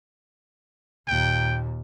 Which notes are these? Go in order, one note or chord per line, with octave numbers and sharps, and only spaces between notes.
D#2 A#2 G5